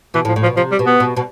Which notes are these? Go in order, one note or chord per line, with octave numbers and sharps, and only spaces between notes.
B2 E3
A2
F3
A2
F3
B2
C3 F3
G3
B2
B3
B2
B2